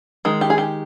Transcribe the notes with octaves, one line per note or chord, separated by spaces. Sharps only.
D#3 G#3
G4
G#4
G4